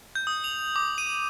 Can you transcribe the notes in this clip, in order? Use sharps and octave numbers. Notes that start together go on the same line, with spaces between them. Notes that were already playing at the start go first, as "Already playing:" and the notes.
G6
D#6
F7
D6
D#7